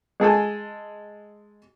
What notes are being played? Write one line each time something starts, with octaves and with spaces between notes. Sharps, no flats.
G#3 G#4 A4 G#5